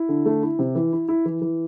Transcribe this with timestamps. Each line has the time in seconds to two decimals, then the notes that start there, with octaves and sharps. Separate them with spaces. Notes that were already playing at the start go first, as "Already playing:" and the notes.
Already playing: E4
0.09 D3
0.26 A3
0.43 E4
0.59 C3
0.75 E3
0.93 E4
1.08 E4
1.25 E3
1.42 E3